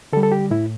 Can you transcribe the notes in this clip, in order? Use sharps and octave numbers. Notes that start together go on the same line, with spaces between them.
D3 G3 A4
A4
G4
A2 E4